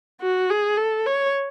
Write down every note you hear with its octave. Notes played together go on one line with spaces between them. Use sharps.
F#4
G#4
A4
C#5